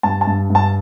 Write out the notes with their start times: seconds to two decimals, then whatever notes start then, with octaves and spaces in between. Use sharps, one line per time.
0.03 G2 A5
0.21 A5
0.27 G2
0.50 G2
0.55 A5